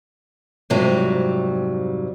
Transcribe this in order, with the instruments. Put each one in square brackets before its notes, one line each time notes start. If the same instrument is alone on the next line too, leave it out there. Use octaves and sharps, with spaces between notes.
[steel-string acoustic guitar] F2 G#2 C3 F#3 G3 A#5